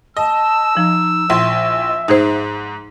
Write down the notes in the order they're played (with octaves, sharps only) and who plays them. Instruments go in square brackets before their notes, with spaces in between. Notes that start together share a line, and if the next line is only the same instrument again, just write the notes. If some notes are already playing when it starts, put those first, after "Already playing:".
[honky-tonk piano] D#5 [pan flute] A5 [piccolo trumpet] E6
[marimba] F3 [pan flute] D#4
[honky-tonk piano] A#1 E4 C6 [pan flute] E5
[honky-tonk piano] G#2 [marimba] D#4 G#4 C5